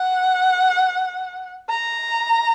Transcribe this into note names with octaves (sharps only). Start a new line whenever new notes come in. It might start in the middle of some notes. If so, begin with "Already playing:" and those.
Already playing: F#5
A#5